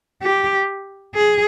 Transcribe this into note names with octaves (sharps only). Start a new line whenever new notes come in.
G4
G#4